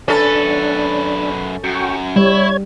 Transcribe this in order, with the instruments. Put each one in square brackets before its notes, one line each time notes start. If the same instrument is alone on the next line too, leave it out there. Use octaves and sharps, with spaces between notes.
[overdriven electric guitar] F#2 B4 [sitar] C#4 A4 [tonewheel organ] D4
[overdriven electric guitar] F#2 [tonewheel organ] F#4 G5 C#6
[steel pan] G3 [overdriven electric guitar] E4 [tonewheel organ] C#5 G#6